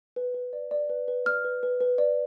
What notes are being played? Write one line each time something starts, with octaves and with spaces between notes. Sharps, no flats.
B4
B4
D5
D5
B4
B4
D5 F6
B4
B4
B4
D5